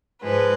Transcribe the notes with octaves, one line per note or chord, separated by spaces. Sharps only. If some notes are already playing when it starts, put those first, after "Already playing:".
G#2 F3 G#3 B4